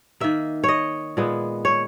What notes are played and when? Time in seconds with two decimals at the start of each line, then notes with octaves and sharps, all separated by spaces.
0.20 D#3 A#3 E5
0.64 C#5 D#5
1.17 A#2 G#3 B3
1.65 C#5